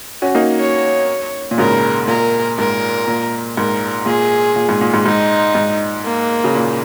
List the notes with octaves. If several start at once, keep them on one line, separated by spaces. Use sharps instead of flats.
C#4 F#4
A#3 D#4
C#5
A#2
G#2 C#3 A#4
A#2 A#4
G#2 A#4
A#2
G#2 A#4
A#2 G#4
A#2
G#2
A#2
G#2
G#2 D#4
G#2
A#3
C#3
A#2